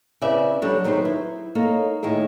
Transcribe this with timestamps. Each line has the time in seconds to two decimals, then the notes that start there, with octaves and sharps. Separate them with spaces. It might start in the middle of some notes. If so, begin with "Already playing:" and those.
0.21 C#3 C4 E4 B4 D5 E5
0.62 F#3 G3 D4 F#4 A4 C#5
0.84 D#3 F#3 B3 G#4 C5
1.05 E4
1.55 A#3 D#4 A4 C#5
2.03 A2 D#3 E4 G#4